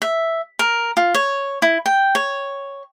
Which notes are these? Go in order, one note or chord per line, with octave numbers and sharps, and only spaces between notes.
E5
A#4
F4
C#5
E4
G5
C#5